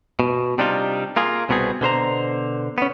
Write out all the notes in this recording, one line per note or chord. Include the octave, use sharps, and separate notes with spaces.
B2
C3 G3 D4 D#4 F4
A#3 F4 G#4
C2 B2 B3 C4 G#4
B2 D3 C5 A#5
B3 C#4